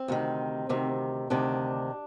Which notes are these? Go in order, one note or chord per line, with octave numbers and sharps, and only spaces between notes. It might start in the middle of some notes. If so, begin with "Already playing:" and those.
Already playing: C4
D2 C3 D#3
D2 C3 D#3
D2 C3 D#3 D4